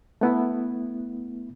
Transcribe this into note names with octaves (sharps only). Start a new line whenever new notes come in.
A3 B3 E4